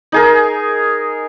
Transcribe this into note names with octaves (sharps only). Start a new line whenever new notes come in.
D#4 G#4 A#4